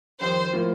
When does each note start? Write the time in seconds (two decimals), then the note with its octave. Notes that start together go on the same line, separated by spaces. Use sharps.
0.21 F2 D#3 G3 C5
0.53 A2 F3 A#3 F4